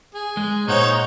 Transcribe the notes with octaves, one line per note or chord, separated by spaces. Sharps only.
G#4
G#3
A#2 D#4 C5 C#5 F#5